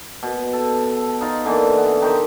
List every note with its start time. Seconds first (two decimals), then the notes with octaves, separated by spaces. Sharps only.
0.23 B2
0.53 A4
1.21 D#4 F4
1.45 A#2 D3 E3
1.77 B3
2.01 D#3 D#4 G4 C5